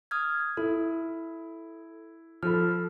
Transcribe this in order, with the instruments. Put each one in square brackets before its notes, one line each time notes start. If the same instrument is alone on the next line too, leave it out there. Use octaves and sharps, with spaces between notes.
[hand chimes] D#6 F6 G#6
[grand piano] E4 [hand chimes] A4
[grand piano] F3 A4 B5 [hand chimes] F6